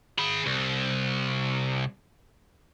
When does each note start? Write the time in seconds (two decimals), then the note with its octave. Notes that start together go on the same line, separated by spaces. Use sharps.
0.18 G#4 B5
0.46 C2